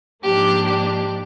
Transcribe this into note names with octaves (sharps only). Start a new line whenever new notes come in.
G#2 F3 A#3 D4 G4
G4